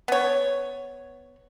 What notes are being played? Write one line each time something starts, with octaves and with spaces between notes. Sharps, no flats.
B3 C#5